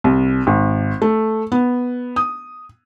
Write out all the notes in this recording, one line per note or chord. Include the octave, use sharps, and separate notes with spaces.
C2
G#1
A3
B3
D#6